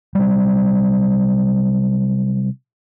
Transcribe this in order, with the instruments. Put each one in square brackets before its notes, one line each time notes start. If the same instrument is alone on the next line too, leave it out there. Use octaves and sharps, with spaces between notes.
[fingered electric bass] C3 F#3 G3